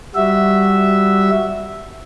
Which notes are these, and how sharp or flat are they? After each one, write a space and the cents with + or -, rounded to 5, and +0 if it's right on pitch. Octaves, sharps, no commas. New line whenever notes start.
G3 +0 F#4 +0 E5 -5